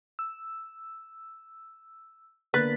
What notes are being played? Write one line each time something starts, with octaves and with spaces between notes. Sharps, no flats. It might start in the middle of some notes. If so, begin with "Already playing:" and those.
E6
D3 A#3 B3 B4 F#6 A6 B6